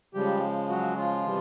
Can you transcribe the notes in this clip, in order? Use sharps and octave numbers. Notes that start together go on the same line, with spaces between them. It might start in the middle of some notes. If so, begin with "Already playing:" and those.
C#3 F3 G3 G#3 G4
F#3 F#4
F3 F4
C3 E3 G3